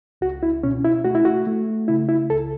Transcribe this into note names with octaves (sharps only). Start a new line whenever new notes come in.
C#2 F#4
E4
B2 C#4
E4
A3 F#4
E4
F#4
A3
C#3 E4
E4
C#2 A4